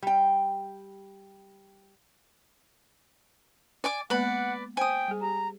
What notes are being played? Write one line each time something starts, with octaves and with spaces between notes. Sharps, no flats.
G3 G5
D5 G#5 D6
G#3 A#3 B3 B4 D5 F#5 B5
C5 G5 G#5 D#6
G3 G#4
G4 A#5